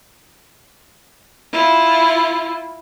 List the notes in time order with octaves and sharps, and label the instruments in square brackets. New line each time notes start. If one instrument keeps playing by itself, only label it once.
[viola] E4 F4